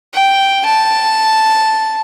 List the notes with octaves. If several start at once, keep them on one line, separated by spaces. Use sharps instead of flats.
G5
A5